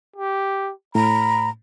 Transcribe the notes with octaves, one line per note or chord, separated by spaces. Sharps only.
G4
A2 A#5 B5